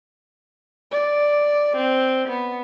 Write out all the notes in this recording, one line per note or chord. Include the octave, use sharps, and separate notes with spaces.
D5
C4
B3